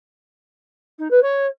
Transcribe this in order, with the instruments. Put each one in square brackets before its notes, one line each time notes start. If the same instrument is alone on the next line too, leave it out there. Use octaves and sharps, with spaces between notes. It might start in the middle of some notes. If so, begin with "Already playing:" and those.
[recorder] D#4
B4
C#5